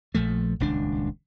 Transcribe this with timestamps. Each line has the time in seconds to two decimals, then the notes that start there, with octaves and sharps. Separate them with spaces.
0.14 A#1 F3 A3
0.60 D#1 C#2 D4